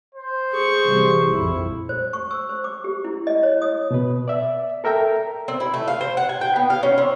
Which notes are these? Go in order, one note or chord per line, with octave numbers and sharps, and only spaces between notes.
C5
G#4 C#6
C3 E3 G3
A#1 F2 E4
C5
C#6
E6
C5
D6
G4
E4
D#5
C#5
D#6
B2 B4
D5 E5
A4 A#4 E5 G5 A#5
C4
E4
A3
F5
C5
F#5
G#5
G5
B3
F5
C#4
C4